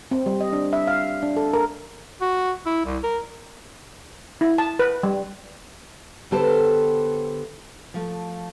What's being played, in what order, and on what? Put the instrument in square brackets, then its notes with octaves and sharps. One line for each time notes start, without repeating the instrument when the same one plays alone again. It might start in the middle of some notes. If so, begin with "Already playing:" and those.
[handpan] C4
G3
D#5
D4
E5
F5
D4
A4
A#4
[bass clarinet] F#4
E4
C2
A#4
[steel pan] E4
A5
B4
G3
[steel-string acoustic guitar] D3 B3 G4 A4 B4 C5
F3 A3